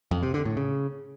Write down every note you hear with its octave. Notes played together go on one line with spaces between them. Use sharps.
F2
C3
D3
A2
C#3